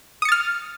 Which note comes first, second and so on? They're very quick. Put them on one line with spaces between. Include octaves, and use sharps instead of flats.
D#6 C#7 A6 F6